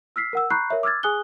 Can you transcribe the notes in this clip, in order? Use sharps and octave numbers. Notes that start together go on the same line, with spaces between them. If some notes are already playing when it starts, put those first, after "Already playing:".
E6 F6 B6 C7
A#4 F#5 E6
A#5 B5 C#6 F#6 G6 C7
A#4 C#5 E5
D6 E6 F6 G#6 A6
G#4 G#5 D#6 F#6 G7